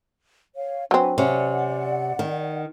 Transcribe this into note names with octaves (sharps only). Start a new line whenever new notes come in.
C#5 F5
F#3 C4 D4 B4 G#5
C3 C#4 D5 F#5
D#3